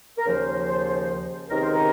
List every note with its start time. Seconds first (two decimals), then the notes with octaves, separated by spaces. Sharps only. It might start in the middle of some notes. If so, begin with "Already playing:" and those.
0.18 A#4
0.24 D#2 C#3 F3 C5
1.49 C#2 C3 D#3 A#4
1.60 C5
1.70 A#4